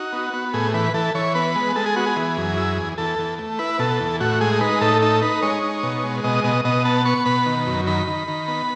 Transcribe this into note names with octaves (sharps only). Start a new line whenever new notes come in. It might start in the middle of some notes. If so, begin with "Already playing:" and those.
Already playing: D#4 F#4
B3
B3
A2 G#4
E3 B4
E3 A4
E3 C#5
B3 B4
G#3
G#3 A4
G#4
B3 F#4
G#4
E3
F#2
E4
E2
E2 A4
E2
A3
E4 B4
B2 A4
E2
A2 F#4
G#3 G#4
D#4 B4
A2 A4
D#4 A4
D#4 B4
G#3 C#5
D#4
B2
G#3
B2 D#5
B2 D#5
B2 D#5
B3 A5
B3 C#6
B2 B5
D#3
F#2
D#3 B5
D#3
D#3
B3